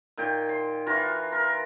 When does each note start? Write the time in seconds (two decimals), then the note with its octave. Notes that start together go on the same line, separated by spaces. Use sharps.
0.18 A#2 D#3 G5
0.49 C6
0.86 E3 F4 F#4 A#5
1.32 A#4